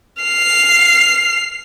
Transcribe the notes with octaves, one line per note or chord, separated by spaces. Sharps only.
F6 C7